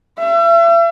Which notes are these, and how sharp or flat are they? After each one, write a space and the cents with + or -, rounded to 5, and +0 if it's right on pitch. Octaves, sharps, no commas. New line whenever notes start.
E5 +40